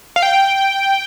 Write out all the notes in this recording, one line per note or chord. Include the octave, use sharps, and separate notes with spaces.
F5
G5